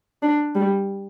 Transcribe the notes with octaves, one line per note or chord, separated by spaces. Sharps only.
D4
G3